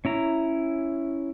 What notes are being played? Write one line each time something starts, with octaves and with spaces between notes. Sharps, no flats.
C#4 E4 A#5